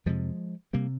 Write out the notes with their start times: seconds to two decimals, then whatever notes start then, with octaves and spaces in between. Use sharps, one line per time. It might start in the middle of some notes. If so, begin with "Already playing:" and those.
0.06 F2 C3 F3 G#3
0.73 C3 G3 A#3